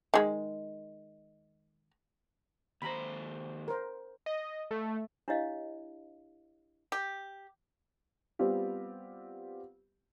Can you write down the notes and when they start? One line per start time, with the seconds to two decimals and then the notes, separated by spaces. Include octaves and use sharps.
0.14 D#3 G#3
2.82 D#2 C5 A#5 B5
3.68 A#4 C5
4.26 D#5
4.71 A3
5.28 D4 E4 G4 C#5 D#5 F5
6.92 G4
8.39 G3 B3 C4 F4 G4